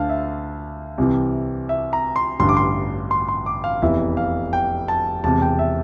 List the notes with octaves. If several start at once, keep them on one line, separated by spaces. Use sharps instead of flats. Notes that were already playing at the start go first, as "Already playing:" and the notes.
Already playing: D2 D3 F5 A5
E5
C2 C3 E3
E5
A#5
C6
A1 G2 D3 C6
D6
C6
C6
C6
D6
F5
F1 E2 E3 E5
F5
G5
A5
E1 E2 C3 A5
G5
E5